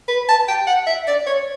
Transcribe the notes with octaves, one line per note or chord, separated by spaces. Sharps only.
B4
A5
G5
F#5
E5
D5
C#5